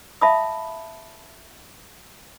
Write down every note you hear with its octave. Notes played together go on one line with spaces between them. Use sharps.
E5 F5 A5 B5 D6 D#6